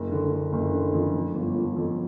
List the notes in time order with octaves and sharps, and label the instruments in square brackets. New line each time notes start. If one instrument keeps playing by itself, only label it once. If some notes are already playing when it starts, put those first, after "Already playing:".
Already playing: [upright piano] F#1
D3
D3
F#1
D3
F2
F2
G1
F3
F2